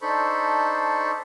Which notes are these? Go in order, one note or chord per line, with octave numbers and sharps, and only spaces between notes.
D4 D#4 A4 C5 B5 C#6